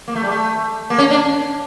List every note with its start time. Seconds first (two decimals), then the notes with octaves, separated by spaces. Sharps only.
0.08 A#3
0.15 A3
0.24 G3
0.31 A3
0.90 A#3
0.98 C#4
1.11 D4